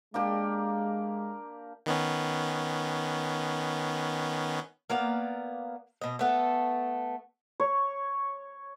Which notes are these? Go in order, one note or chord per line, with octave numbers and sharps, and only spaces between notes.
G#3 A#3 D4 G4
D#3 B3 C#4
A#3 B3 D5 F5
B2 D#5
A3 B3 A4
C#5